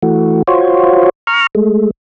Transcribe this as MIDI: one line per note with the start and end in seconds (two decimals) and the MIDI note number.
0.02 0.43 52
0.02 0.43 57
0.02 0.43 66
0.47 1.09 65
0.47 1.09 66
0.47 1.09 72
0.47 1.09 73
1.27 1.47 82
1.27 1.47 85
1.27 1.47 89
1.55 1.91 56
1.55 1.91 57